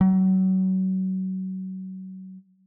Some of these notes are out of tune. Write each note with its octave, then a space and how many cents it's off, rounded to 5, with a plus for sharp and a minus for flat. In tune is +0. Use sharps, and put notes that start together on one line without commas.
F#3 +30